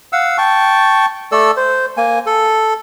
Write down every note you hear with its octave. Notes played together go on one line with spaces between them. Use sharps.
F5 F#5 E6
G5 A5 C#6
A3 A4 D5 E6
C5
A#3 G#5
A4